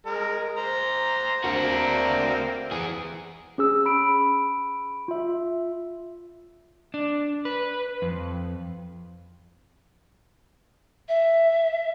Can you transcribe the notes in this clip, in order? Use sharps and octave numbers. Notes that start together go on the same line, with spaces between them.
G#3 A#4
C5 A#5
A#3 C4 D4 F#4 A#4
E3 G#4
C#4 G#4 E6
B5 D7
F4 E5
D4
B4
F2
E5